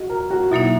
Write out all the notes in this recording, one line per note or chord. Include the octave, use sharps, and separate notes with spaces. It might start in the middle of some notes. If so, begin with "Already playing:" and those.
Already playing: F#4 D#5
A#4
F#4
B2 F#3 A#3 D#4 E4